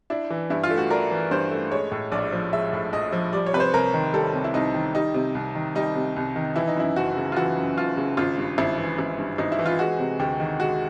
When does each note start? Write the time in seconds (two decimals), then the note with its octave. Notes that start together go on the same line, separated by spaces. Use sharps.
0.10 D4 E4
0.30 E3
0.50 G2 E4
0.63 F4
0.70 A3
0.77 F#4
0.90 D4 A#4
1.11 E3
1.31 G2 C5
1.51 A3
1.71 G#3 C#5
1.92 A2
2.12 A#1 D5
2.32 F3
2.52 G#3 E5
2.73 A2
2.93 A#1 D#5
3.13 F3
3.33 G3 D5
3.47 C#5
3.53 C3 B4
3.60 C5
3.73 C2 A#4
3.94 D#3
4.14 G3 A4
4.33 C3
4.44 E4
4.54 C2 D#4
4.74 D#3
4.95 G3 D#4
5.14 C3
5.35 C2
5.55 D#3
5.75 G3 D#4
5.95 C3
6.16 C2
6.36 D#3
6.56 E3 E4
6.68 D#4
6.76 F#2 E4
6.96 F#1 F#4
7.17 C#3
7.32 F4
7.37 E3 F#4
7.57 F#2
7.77 F#1 F4
7.97 C#3
8.17 G#1 F4
8.38 G2
8.58 G#1 E4
8.78 E3
8.98 G#1
9.18 G2
9.38 G#1 D#4
9.52 E4
9.59 E3
9.66 F4
9.79 G#3 F#4
9.99 C3
10.19 D2 G4
10.40 D#3
10.60 G#3 F#4